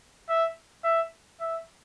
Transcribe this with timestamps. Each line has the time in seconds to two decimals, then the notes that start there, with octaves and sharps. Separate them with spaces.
0.29 E5
0.84 E5
1.40 E5